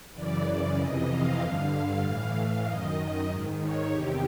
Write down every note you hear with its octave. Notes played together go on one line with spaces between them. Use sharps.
F#2 C#3 E3 D5
F2 C3 E3 D#5
F5
G2 D3
F5
A2 E3
F#2 D#3 D#5
G#2 D#3
C#5
E2 C3 D#3 G4